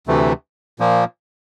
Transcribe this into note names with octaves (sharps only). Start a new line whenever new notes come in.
D2 C3 E3 A3
A#2 F3 A#3